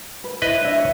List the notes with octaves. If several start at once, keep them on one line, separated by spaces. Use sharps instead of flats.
B4
E4 B4 C5 D#5
D4 E5
C#5 E5